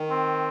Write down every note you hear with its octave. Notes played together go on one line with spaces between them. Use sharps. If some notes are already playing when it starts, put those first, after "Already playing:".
Already playing: D#3
C4